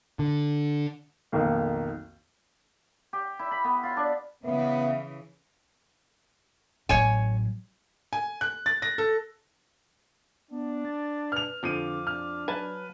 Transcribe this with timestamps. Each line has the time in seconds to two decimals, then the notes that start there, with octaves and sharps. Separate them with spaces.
0.19 D3
1.32 B1 F2 D#3 A#3
3.13 G4
3.39 E4
3.51 B5
3.64 B3
3.83 F4
3.97 D4
4.45 C#3 E3 B3 E5
6.89 A1 F#3 C#5 G#5
8.13 G#5
8.41 F#6
8.66 A6
8.82 A#6
8.98 A4
10.51 B3 D4
10.85 A6
11.32 B4 F6 F7
11.63 F2 D3 F3 D6 D#7
12.07 D4 F6
12.48 F#3 B4 G#5 A5